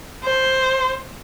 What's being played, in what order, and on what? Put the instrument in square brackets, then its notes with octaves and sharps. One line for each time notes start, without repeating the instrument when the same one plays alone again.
[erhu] C5